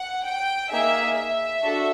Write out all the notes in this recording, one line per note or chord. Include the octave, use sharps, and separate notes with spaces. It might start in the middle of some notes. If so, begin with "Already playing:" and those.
Already playing: F#5
G5
A#3 D#4 G#4 E5
E5
D4 F#4 A4